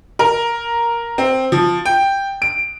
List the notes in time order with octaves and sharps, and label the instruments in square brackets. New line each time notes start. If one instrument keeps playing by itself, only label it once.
[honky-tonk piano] A#4
C4
F3
G5
D7